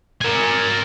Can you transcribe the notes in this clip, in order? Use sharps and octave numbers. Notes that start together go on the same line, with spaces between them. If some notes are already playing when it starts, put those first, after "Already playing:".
A#4 G#5